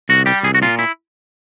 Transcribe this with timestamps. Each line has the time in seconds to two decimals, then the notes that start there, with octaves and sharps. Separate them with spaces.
0.09 C2 F#4
0.26 G3 G4
0.43 C2 G#4
0.55 F#4
0.62 A#2 F4
0.79 E4